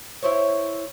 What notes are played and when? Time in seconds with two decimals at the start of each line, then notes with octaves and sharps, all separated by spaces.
0.22 E4 C5 C#5